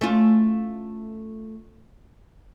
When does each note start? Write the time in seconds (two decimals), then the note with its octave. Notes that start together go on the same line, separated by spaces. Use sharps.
0.01 A3 C#4 F4